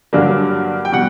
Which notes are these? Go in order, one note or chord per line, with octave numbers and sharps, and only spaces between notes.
G2 D3 F#3 A#3 D4
G5
B2 G3 F#5